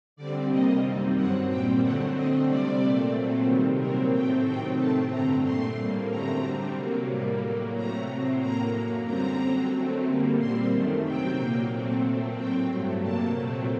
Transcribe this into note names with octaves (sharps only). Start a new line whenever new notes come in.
D3 G3 C4 D5
C3 G3 A#3 D#5
F#2 D#3 G3 C4
G2 F#3 C4 F#5
A#2 G3 C4 G5
D3 F#3 A3 C4 F#5
D3 A3 C4 D#5
C3 G3 C4 D5
A#2 A3 C4
A#2 F#3 A3 C4
C3 D#3 G3
A#2 F#3 C4 A#4
A2 A3 C4 G5
C3 D#3 F#3 C4 G5
A2 A3 C4 A5
G2 D3 A3 C4 A#5
A#2 A3 C4 C6
A2 G3 A#3
F#2 D3 A3 C4 A#5
D3 G3 C4
C3 F#3 A#3
A2 G3 A#3
A2 F#3 A#3
C3 F#3 A3 A#5
A2 F#3 C4
A2 F#3 A#3 A#5
F#2 F#3 A#3
F#2 D3 G3 C4 A#5
D3 F#3 C4
F#2 F#3 A3 C4
D3 G3 A#3
A#2 G3 C4 C6
F#2 D#3 A3
C3 D#3 F#3 C4 G5
A#2 F#3 A#3
A#2 F#3 A3 C4
A#2 A3 C4
A2 F#3 C4 G5
G2 F#3 A3
C3 F#3 A#3 A5
A#2 F#3 A3 C4